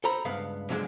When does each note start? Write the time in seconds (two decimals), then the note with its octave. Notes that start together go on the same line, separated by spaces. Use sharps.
0.04 A4 C5 A#5 B5
0.25 C#2 G2 B3 F5
0.69 D3 F3 F#3 G#3